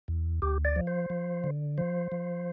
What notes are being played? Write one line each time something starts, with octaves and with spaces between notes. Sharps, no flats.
E2
D2 G4
D5
F3
C5
F3
D3
F3 C5
F3